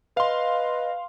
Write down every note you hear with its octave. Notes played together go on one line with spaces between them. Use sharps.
B4 D#5 F5 C6